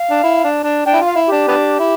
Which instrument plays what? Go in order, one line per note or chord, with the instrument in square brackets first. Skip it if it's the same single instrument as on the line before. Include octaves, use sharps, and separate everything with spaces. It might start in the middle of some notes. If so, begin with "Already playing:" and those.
Already playing: [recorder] F5
[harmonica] D4
E4
D4
D4
[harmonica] D4 [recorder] G5
[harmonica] E4
[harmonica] F4 [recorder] F5
[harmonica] E4
[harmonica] D4 [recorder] G4
[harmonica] B3 D4
E4